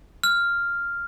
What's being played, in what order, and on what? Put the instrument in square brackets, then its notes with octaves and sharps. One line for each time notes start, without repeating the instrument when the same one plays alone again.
[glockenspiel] F6